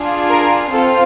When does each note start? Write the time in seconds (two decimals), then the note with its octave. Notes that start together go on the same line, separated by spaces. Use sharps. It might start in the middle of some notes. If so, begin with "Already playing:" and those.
Already playing: D4 F4 G#4
0.30 A#4
0.72 C4 F4 A4